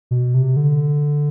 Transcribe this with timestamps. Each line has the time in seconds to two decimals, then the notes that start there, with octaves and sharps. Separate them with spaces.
0.11 B2
0.34 C3
0.56 D3